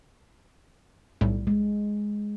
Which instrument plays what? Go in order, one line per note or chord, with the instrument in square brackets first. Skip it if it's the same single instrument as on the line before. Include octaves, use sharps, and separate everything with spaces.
[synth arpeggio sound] B1 A2 G3
[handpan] G#3